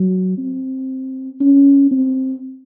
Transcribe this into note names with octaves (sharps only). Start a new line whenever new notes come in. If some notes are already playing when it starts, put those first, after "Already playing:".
Already playing: F#3
C4
C#4
C4